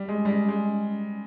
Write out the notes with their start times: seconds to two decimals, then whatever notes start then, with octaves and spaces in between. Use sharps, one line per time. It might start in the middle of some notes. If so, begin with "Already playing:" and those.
Already playing: G3
0.08 G#3
0.25 G3
0.29 G#3
0.49 G#3